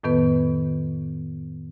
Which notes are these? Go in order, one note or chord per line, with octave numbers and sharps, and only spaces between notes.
F2 A2 D#3 B3 B4